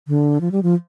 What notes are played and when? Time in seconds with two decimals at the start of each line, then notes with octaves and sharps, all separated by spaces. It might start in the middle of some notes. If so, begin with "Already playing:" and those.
0.08 D3
0.41 F3
0.52 G3
0.63 F3